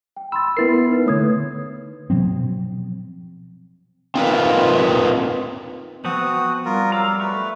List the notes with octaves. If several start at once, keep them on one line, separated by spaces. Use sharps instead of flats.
G5
B5 C6 E6 A6
B3 E4 A#4 B4 A6 C7
D#4 B4
D3 A3 C#5 D#6 G#6
B2 F3 F#3 C4
C4 D#4 F4 F#4 A#4 B4
F3 B3 C4 F#4 F#5 D#6
G3 F4 A#4
F#3 F5 A#5 D6 E6
A3 B4 C#6